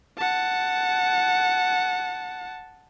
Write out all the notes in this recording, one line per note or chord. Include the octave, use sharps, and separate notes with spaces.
F#5 A5